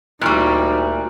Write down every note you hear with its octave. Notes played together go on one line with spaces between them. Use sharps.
D2 A#2 G3 D#4 E4 C#6 F6 F#6